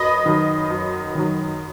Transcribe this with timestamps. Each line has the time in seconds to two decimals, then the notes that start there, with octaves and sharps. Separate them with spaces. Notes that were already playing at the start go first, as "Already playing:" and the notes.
Already playing: F#2 B4 D#5
0.26 D#3 F#3
0.70 F#2
1.15 D#3 F#3